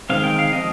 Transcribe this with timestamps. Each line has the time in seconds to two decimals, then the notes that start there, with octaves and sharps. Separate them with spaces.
0.10 D#3 G#3 C4 F5
0.24 G5
0.39 F5
0.52 F3 G#3 C4 D#5